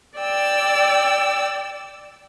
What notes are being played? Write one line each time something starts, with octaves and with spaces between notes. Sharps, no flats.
D5 G5 E6